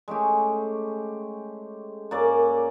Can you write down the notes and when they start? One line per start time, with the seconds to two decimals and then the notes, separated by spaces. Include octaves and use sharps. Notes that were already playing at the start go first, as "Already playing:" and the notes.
0.08 G#3 A3 C#4 G4
2.11 F#2 A#3 C#4 D5